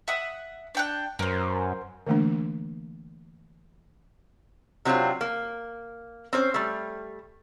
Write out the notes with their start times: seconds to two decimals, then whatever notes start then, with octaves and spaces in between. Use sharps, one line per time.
0.08 E5 F#5 D#6
0.75 D4 G5 F#6
1.19 F#2 A#4 C5
2.07 D3 E3 A3 A#3 D4
4.85 C3 F#3 C4 D4 F4
5.21 A#3
6.33 C4 C#4 C5
6.54 G3 A3